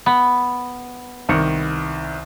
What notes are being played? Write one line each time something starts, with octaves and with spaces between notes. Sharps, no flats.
B3 B5
C2 D#3 C#7